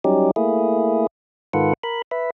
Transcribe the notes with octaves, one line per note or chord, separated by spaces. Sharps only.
F#3 G3 C#4 D#4 G4
A3 A#3 E4 G#4
G#2 D#3 F4 A4 B4 F#5
A#4 B5
B4 E5